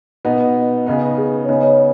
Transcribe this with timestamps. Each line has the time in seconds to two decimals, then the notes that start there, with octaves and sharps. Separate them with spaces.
0.25 B2 B3 D#4 F#5
0.87 C#3 B3 D#4
1.18 G#4
1.45 C#5
1.49 C#3 B3 D#4 D#5
1.63 C#5